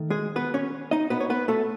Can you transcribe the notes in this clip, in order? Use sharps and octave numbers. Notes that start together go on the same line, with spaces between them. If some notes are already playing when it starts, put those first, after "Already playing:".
Already playing: D#3 A3
G#3 G#4
B3 B4
C#4 C#5
D#4 D#5
B3 B4
C#5
B3 B4
A3 A4